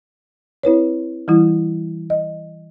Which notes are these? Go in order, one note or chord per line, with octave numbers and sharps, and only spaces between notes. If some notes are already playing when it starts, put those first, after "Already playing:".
C4 E4 B4 C#5
E3 G3 E4
D#5